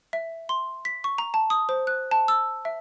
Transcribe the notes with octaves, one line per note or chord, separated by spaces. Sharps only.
E5
C6
B6
C#6
A#5
A5
D#6
C5
F#6
A5
E6
E5